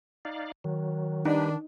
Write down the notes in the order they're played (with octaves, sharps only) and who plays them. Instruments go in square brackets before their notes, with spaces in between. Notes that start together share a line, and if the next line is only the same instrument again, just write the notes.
[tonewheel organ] D#4 D5 F5
[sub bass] D#3 [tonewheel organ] F#3
[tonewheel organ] G3 G4 B4 [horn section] D4 [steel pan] D#4